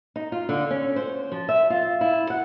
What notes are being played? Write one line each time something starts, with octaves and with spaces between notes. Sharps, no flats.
D#4
F4
D3
C#4
C5
F3
E5
F4
E4
F#5